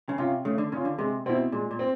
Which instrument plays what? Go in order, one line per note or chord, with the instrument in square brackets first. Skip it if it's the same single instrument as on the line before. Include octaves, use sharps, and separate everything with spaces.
[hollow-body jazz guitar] C#3
[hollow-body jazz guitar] C3 [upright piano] C#4 F4
[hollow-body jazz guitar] C#3 [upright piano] A3
[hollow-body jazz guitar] D3
[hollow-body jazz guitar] C#3 [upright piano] C#4 F4
[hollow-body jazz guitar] D3
[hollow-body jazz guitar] C3 [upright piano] G#3
[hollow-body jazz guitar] B2 [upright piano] C4 E4
[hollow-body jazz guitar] A#2 [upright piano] G#3
[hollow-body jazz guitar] A#2
[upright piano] C4